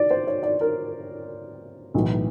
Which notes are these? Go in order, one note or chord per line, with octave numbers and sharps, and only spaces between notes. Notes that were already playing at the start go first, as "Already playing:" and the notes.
Already playing: D5
C5
C#5
D5
A#4
B1 A2 E3